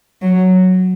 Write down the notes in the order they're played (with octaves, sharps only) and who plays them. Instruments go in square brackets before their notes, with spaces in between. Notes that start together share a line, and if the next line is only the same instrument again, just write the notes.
[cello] F#3